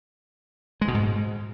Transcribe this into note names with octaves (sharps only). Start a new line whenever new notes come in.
G#3
B2
G#2